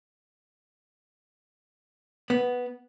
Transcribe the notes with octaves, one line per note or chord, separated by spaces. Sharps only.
B3